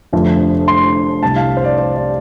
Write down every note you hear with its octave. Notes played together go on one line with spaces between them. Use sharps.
F1 F2 D3 F3 A3
C6
C2 C3 G3 A5
F5
C5
D5
C5
D5